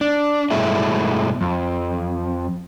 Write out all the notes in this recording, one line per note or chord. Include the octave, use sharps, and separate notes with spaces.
D4
G2 B2 G#3 A3 E4
F2